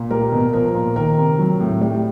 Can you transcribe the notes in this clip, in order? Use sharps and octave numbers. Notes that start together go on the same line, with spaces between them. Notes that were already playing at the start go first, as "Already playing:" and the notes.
Already playing: A#2
G3 A#4
B2
F3 A#4
A#2
D#3 A#4
C3
F#3
A2
G3